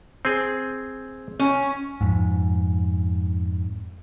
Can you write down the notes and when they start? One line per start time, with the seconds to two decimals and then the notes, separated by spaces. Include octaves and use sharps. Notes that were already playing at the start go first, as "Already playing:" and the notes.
0.25 C4 G#4
1.39 C#4
2.01 F2 G#2